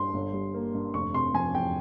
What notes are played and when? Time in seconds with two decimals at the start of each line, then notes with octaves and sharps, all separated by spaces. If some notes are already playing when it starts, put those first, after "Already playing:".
Already playing: G2 C6
0.14 G1
0.33 G3
0.54 A#3
0.75 G2
0.94 F1 C#6
1.14 C3 C6
1.34 F3 G#5
1.53 E2 G5